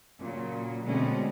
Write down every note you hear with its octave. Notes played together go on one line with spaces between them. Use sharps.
A#2 C#3 F#3
B2 D3 G#3 A3 C4 C#4